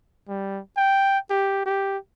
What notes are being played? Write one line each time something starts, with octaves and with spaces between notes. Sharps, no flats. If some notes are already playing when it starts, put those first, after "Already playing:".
G3
G5
G4
G4